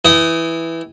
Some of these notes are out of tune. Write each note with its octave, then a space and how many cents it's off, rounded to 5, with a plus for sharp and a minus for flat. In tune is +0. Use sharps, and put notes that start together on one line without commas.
E3 +0 G5 -40 D#6 +0